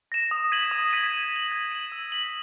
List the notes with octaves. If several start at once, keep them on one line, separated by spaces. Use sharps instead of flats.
A#6 E7
D#6
G#6 B6 D#7 F#7
D#6
G#6 B6 D#7 F#7
G#6
D#7 F#7
G#6
D#7 F#7
E6
B6 F#7